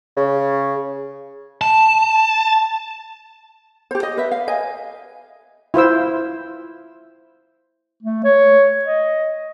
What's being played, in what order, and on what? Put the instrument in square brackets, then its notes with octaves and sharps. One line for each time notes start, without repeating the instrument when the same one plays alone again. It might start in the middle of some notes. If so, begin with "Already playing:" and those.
[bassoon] C#3
[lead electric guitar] A5
[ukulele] G4 C5
D#5
B4 E5
F5
D#5 G#5
[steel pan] E4 F4 C5 E6
[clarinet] A3
C#5
D#5